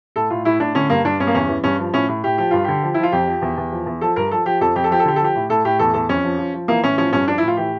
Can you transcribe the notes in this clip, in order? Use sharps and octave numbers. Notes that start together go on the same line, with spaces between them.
A2 A4
A2 F4
A2 E4
A2 D4
D3 C#4
G2 A#3
G2 D4
G2 C#4
A#3
E2 C#4
E3
G2 C#4
F3
A2 C#4
A2
A2 G4
F3 G4
G2 F4
D3 G4
F3
F3 E4
F4
F2 G4
F3
E2
E2
F3
E2
F3 A4
G2 A#4
F3 A4
F3 G4
F2 A4
F2 G4
A4
F3 G4
A4
D3 G4
A4
F3 G4
A2
A2 A4
A2 G4
E2 A4
E2 A4
F2 C#4
F3
F3
F3
E3 A#3
A2 C#4
F3 C#4
G2 C#4
F3 D4
E4
A2
F4
E3 G4